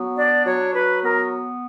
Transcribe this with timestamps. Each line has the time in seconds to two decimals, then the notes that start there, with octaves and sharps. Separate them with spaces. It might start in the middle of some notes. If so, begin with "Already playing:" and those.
Already playing: F#3 B3
0.17 D4 D5
0.46 F#3 C#5
0.74 F#3 B4
1.03 B3 A#4